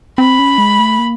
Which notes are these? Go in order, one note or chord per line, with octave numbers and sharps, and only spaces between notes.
C4 B5
C#4
G#3
A3
A#3